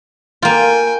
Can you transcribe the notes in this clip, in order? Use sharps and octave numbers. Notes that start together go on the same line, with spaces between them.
A#3 F4 G5 G#5